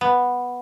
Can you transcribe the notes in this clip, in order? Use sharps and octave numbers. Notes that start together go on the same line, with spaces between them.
B3